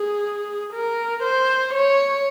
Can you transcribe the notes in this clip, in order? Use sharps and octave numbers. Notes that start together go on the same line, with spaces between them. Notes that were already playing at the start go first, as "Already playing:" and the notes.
Already playing: G#4
A#4
C5
C#5